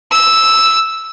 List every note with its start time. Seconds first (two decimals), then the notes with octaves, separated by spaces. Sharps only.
0.11 E6